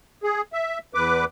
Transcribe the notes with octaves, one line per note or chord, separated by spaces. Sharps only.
G#4
E5
E2 B4 D6